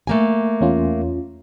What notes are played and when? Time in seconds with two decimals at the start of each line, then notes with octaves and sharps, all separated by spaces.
0.07 A3 A#3 G#5
0.61 E2 C#4 F4